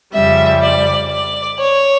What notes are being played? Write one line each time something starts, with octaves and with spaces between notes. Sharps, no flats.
F2 C#3 G3 E5
D5
D5
C#5